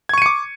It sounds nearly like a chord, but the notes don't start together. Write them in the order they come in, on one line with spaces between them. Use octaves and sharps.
G#6 C#6 D#7 C#7 D6